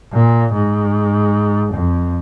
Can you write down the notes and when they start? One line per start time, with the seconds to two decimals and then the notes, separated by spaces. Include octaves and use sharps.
0.13 A#2
0.53 G#2
1.74 F2